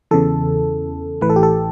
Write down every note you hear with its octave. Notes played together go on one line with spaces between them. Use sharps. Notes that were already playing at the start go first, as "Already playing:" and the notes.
E2 C#3 E3 A4
A1 A2 E3 B4
A4
G4
A4